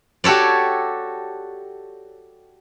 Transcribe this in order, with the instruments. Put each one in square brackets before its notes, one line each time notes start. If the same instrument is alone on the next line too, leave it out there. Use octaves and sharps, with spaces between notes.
[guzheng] F#4 G4 A4 C#5 D5